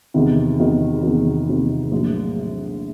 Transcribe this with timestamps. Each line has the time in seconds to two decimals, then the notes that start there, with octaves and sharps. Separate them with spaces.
0.14 E2 C3 D#3
0.60 E2 C3 D#3
1.03 E2 C3 D#3
1.48 E2 C3 D#3
1.92 A#1 A2 F#3